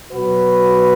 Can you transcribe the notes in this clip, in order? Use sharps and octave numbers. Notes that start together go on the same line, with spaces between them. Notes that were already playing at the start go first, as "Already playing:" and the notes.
B2 F#3 F#4 B4